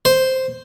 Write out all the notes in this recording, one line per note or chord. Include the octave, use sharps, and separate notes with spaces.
C5